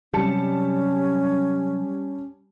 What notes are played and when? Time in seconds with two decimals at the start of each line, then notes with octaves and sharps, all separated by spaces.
0.14 C3 F#3 G3 C#4 A5 C#7